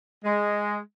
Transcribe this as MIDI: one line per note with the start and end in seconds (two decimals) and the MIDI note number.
0.24 0.77 56